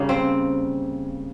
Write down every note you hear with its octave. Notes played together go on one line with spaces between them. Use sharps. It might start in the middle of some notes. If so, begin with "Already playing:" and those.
Already playing: C#3 G3 A#3
C4